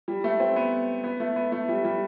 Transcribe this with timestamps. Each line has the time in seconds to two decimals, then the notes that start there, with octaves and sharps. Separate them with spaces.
0.08 G3
0.24 A3
0.40 C4
0.56 B3
1.04 B3
1.20 A3
1.36 B3
1.52 A3
1.69 G3
1.84 G3